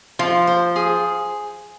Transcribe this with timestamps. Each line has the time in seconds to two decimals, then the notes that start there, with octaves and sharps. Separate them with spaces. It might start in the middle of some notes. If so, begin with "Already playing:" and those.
0.19 F3 F4
0.47 C5
0.76 G#4